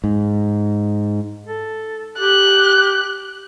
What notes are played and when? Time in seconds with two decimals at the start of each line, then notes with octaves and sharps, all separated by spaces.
0.04 G#2
1.47 A4
2.19 G4 F#6